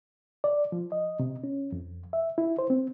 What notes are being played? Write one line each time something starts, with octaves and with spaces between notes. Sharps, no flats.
D5
F3
D#5
C3
C#4
F2
E5
E4
C5
C4